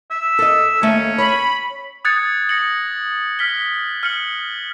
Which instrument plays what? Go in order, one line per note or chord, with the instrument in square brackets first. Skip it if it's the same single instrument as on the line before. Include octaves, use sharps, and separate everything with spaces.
[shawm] E5
[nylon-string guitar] A4 D#5
[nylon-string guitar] D#2 A3 [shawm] C#4
[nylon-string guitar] C#5 [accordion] B5
[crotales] D#6 F#6 G#6 A6 C#7
A#6 C#7 F#7
F6 B6 G7
F6 C#7 F#7